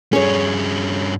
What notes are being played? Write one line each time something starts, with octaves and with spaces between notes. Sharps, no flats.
G2 C#4 G#4 C#5